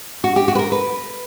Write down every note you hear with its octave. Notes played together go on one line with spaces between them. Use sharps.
F#4
G4
F#4
B4
A#4
B4